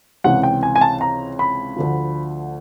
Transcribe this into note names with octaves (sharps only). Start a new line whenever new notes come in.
C#2 C3 E3 F#5
G5
G#5
G#5
A5
A#5
B5
D2 D3 F3